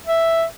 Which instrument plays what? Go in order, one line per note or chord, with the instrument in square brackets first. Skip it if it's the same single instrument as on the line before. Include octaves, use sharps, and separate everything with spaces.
[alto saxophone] E5